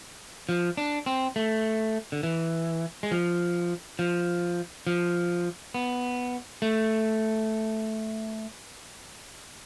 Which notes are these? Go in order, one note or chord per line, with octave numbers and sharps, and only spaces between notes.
F3
D4
C4
A3
D3
E3
G#3
F3
F3
F3
B3
A3